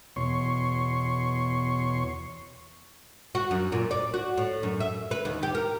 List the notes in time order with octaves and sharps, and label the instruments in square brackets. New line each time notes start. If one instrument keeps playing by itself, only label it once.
[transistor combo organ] E2 B2 C#5 C6 C#6
[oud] F#4
F#2
A#2
D5
F#4
A2
F#2
E5
B4
D#2
G4
A#4